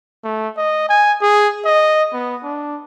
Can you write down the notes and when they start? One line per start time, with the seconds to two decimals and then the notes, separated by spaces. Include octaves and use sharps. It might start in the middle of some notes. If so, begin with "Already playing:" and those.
0.24 A3
0.57 D#5
0.89 G#5
1.22 G#4
1.65 D#5
2.13 B3
2.43 D4